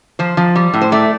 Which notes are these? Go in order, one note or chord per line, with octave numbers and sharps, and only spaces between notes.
F3 C5
F3
G3
A2
C5
A3 D5